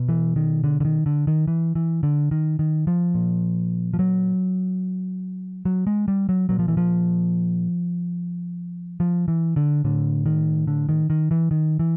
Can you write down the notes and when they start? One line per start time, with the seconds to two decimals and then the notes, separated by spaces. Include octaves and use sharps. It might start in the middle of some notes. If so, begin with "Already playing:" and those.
Already playing: B2
0.09 E3
0.36 D#3
0.64 D3
0.80 D3
0.85 D#3
1.06 D3
1.27 D#3
1.47 E3
1.75 E3
2.03 D3
2.31 D#3
2.59 D#3
2.87 F3
3.14 A#2
3.94 F3
3.99 F#3
5.65 F#3
5.87 G#3
6.08 G3
6.29 F#3
6.49 A#2 F#3
6.59 F3
6.68 E3
6.77 F3
9.00 F3
9.28 E3
9.56 D3
9.84 A2 D3
10.26 D#3
10.67 D3
10.89 D#3
11.10 D#3
11.31 E3
11.51 D#3
11.79 E3